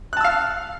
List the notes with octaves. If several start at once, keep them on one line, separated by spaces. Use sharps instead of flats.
F5 A5 E6 F#6